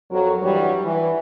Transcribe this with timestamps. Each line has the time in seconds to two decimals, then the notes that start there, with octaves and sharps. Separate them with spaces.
0.11 F2 F#3 A#4
0.42 G2 E3 F#3 G3
0.84 E3